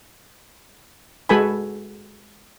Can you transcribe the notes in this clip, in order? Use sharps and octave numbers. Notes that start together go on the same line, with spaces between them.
G#3 F#4 A4 B4 G#5 B5